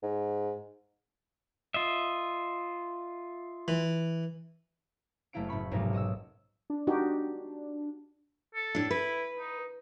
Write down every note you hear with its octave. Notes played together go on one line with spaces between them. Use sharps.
G#2
F4 D#5 E5
E3
F#1 A3 A#3 E4 F5 D7
F#1 A2 B5 C#6
F1 B1 G#2 A3 D#4 A#4
F#4 D#5 D#6 E6
D4
D#4 F#4 G4
A4
A2 D4
E4 B4
D#4